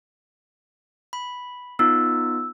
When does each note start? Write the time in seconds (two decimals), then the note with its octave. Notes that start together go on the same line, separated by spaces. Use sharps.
1.13 B5
1.79 B3 D#4 F4 E6